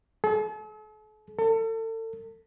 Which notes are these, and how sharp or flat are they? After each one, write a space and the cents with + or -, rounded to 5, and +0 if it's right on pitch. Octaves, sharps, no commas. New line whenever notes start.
A4 -45
A4 +35